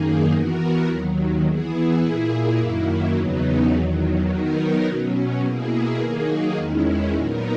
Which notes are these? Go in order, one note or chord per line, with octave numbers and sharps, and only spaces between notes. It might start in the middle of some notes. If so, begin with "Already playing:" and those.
Already playing: F#2 D#3 A#3 D#4 G#4
E3 B3 F#4 A#4
D#2 D#3 F#3
E3 B3 E4 G#4
A#2 A#3 E4 G#4
F#2 D#3 F#3 A#3 E4
E2 C#3 F#3 B3 D#4
E2 D#3 F#3
D#3 F#3 B3 D#4 A#4
B2 F#3 C#4
B2 A#3 E4 G#4
D#3 F#3 A#3 D#4 G#4
E2 D#3 G#3 C#4 E4
A#2 F#3 B3 D#4 A#4